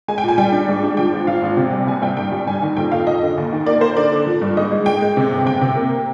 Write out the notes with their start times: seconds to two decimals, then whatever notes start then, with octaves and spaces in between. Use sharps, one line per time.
0.08 G#3 G#5
0.18 G5
0.23 A#2 G#5
0.38 G3 G5
0.52 D4
0.68 G#2
0.83 D4
0.97 F3 G5
1.13 G#1
1.27 F3 F5
1.42 G#1
1.57 C3
1.72 G3
1.87 C2 G#5
2.02 C2 G5
2.17 G2 G5
2.32 G3
2.47 G2 G#5
2.62 D#3
2.77 F2 G5
2.92 F2 F5
3.07 F2 D#5
3.23 D3
3.38 D#2
3.52 D#3
3.66 A#3 D5
3.81 A#3 C5
3.96 D3 D5
4.12 D3
4.27 F3
4.41 G2
4.57 G#2 D#5
4.72 G#3
4.86 G#3 G5
5.02 G#3
5.17 C3
5.31 G1
5.46 C3 G5
5.61 C3
5.76 A#3